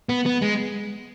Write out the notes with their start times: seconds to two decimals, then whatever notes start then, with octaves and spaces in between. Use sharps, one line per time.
0.09 B3
0.26 B3
0.42 G#3